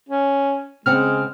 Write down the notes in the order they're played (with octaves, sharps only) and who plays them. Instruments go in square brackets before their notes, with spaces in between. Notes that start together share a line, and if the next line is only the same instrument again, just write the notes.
[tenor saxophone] C#4
[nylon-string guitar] C#3 C4 F#5 [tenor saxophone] G#3 [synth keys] F6